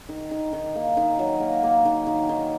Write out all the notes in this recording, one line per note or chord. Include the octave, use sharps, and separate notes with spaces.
D#3
D#3
D#3
A#3
D#3
F#3
A#3
A#3
D#3
D#3
D#3